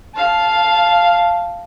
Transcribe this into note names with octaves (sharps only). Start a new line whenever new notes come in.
F5 A5